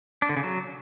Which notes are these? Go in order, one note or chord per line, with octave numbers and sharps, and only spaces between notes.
D4
D3
C#3
F#3